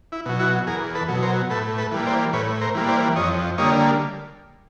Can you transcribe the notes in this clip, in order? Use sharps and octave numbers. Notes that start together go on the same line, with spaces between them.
E4
B2 F#3
E4 F#4
E2 G#4 A#4
A4 B4
B2 F#3
A#4 C5
A2 A4 B4
A4 B4
E3 G3 A#3
C5 D5
A2 B4 C#5
A#4 C5
E3 G3 A#3
C5 D5
F2 C#5 D#5
D3 G3 A#3 C#5 D#5